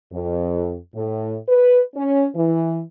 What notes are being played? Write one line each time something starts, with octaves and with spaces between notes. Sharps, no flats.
F2
A2
B4
C#4
E3